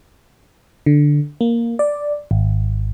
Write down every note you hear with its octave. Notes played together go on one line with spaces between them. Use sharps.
D3
A#3
D5
G#1